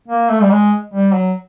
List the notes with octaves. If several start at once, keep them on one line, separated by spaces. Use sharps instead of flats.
A#3
A3
G3
G#3
G3
F#3